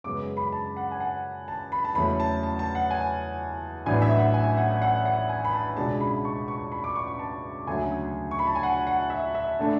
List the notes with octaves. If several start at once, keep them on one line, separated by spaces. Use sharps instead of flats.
F#2 C#3 G#3 B3 D6
B5
A5
F#5
G#5
F#5
A5
B5
A5
E2 C#3 F#3 A3 C#4 B5
A5
A5
A5
F#5
G#5
A1 A2 F#3 B3 D4 G#5
E5
F#5
G#5
F#5
F#5
F#5
G#5
B5
A5
C#2 B2 G#3 D4 A5
B5
C#6
C#6
B5
D6
C#6
C#6
A5
D2 C#3 F#3 A3 G#5
C#6
B5
A5
G#5
F#5
F#5
E5
E5
D3 A3 D4